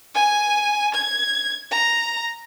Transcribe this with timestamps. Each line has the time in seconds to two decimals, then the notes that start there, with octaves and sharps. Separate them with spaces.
0.14 G#5
0.94 G#6
1.71 A#5